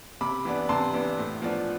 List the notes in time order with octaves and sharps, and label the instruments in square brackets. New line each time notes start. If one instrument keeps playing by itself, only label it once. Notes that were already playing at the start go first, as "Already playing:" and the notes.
[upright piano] C3 B5 D6
E3 B3 D4
C3 A5 C6
E3 B3 D4
A2
F3 B3 D4